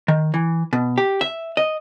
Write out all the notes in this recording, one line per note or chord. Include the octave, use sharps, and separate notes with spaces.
D#3
E3
B2
G4
E5
D#5